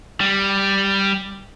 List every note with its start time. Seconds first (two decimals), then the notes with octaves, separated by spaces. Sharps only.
0.20 G3